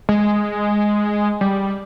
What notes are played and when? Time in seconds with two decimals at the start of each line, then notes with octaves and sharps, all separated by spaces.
0.09 G#3
1.41 G3